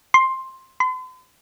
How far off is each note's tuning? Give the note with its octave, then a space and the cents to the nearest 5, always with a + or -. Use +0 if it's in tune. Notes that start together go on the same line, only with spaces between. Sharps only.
C6 +10
C6 -45